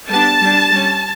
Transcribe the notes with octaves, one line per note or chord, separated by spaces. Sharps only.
G3 B3 D4 A5
G3 D4
G3 C#4